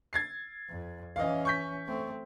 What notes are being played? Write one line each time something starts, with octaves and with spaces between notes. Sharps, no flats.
G#6 A6 C7
F2
E3 C#4 D#5 F5
C#6 G6 B6
A3 C4